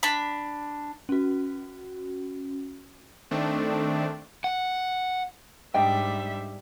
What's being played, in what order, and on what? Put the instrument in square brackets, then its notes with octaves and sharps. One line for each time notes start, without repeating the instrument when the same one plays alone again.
[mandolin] D4 B5
[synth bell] C#4 F#4
[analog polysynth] D#3 A3 C4 D4
[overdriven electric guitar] F#5
[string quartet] G#2 G3 E5 [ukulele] D4 D#5 G5